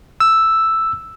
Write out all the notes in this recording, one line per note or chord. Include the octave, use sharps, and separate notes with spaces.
E6